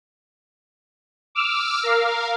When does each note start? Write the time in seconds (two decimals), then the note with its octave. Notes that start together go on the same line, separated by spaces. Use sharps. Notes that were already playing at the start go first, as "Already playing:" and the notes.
1.35 D6 E6 F6
1.83 A#4 F5